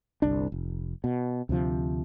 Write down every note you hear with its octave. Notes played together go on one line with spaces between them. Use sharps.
G1 C2 D4
F1
B2
D2 C3 F3